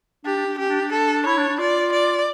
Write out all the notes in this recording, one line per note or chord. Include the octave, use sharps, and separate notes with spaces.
D4 G4
D4
D4
C#4 G4
D4
D4
A4
E4 C#5
D4
D4
F4 D5
D5